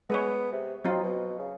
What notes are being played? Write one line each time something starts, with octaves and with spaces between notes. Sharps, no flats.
G#3 B3 B4 C#5
C3
F#3 C4 D#4 F4
B2
C#3